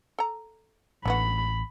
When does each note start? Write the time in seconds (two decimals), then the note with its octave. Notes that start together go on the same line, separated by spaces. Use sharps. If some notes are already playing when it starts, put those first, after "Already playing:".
0.19 A4 A#5
1.05 A1 D3 B3 F#4 B5